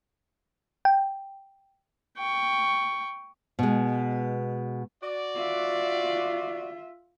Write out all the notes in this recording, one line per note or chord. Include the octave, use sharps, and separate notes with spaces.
G5
G5 C#6
B2 G#3
F#4 D5
F4 E5